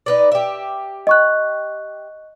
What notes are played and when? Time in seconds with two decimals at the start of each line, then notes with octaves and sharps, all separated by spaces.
0.06 D#4 B4 D5
0.31 G4 E5
1.07 D#5 C#6 F#6